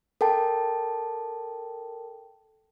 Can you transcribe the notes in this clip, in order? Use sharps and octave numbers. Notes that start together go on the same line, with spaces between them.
A4 A#4 G5 A5